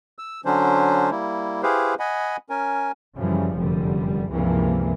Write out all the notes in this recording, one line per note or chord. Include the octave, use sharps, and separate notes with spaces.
E6
D3 F#3 C#4 D4 C5
G3 A#3 E4
E4 G4 G#4 B4 C5 F5
D#5 F#5 G#5 B5
C#4 A#4 G#5
F#2 C#3 E3 F3 G3
F1 F#2 D3 G3
C#2 G2 C3 E3 F3 A#3